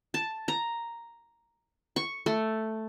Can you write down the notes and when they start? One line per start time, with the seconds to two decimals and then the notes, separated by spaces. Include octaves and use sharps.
0.14 A5
0.48 A#5
1.96 C#6
2.26 A3